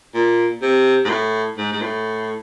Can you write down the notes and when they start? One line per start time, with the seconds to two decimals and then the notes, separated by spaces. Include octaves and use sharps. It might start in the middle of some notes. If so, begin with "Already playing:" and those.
0.14 A#2
0.62 C3
1.05 G#2
1.09 A2
1.58 G#2
1.72 G#2
1.82 A2